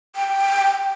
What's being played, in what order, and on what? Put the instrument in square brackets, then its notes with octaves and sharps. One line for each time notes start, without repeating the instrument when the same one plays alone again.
[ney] G5